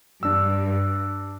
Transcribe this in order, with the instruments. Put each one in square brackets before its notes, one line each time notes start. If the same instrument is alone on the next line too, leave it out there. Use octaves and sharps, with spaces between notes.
[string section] G2 [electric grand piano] D4 E6